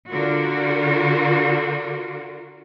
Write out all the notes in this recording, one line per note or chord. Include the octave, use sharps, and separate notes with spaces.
D3 F4 F#4 A#4